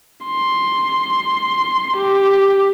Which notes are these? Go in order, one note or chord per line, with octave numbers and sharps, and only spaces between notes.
C6
G4